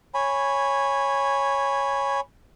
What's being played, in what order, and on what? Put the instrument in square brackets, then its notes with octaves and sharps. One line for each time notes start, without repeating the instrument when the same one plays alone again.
[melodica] C#5 G#5 B5